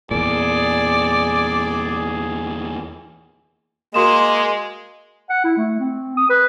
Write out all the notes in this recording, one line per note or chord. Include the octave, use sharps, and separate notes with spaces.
E2 A#2 G#4 D5
G#3 A#3 F#4 D#5 C6 E7
F#5
E4
A3
C4
D#6
B4